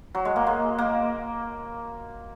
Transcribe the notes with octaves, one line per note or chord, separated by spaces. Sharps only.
F#3
G#3
A#3
G#3
A#3